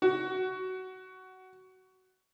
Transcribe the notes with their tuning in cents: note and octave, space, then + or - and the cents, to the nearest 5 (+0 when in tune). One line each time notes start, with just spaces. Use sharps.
F#4 +15